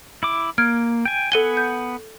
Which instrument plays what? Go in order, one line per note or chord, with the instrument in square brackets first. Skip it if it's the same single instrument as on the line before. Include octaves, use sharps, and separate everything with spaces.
[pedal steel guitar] E4 D6
[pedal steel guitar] A#3 [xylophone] F6 G#6 D7
[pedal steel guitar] G5 G#5
[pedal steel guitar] B3 F#5 G#5 [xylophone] A4 D#7 G7
[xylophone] G6